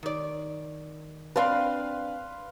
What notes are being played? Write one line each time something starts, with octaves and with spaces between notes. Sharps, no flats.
D#3 D5
C4 D4 B4 F5 C6